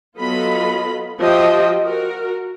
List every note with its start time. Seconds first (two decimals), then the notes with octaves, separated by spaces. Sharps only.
0.17 F#3 B3 F4 A4 D#5 B5
1.18 F3 F#4 G4 D#5 E5 G5
1.82 F#4 A#4